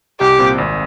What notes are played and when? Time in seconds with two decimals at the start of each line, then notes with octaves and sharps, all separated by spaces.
0.20 C2 G4
0.39 A#2 G3 C4
0.58 G#1